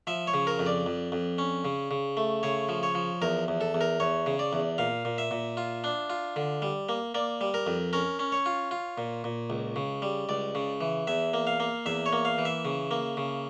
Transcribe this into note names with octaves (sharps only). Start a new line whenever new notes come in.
F3 E5
C#5
C#3
A#4
F2
D5
F2
F2
C#4
C#3
C#3
A3
C#3 C#5
F3
C#5
F3
E2 A#4
E2
A4
E2
A#4
E2 C#5
C#3
D5
E2
A#2 F5
A#2
E5
A#2
F4
D4
F4
D3
G3
A#3
A#3 D5
G3
A#4
F2
C#4 A#4
C#4
C#5
F4
F4
A#2
A#2
C#2
C#3
G3
C#2 D5
C#3
E3
E2 E5
A#3
F5
A#3
E2 E5
C#5
A#3
F5
E3
E5
C#3
A#3
C#3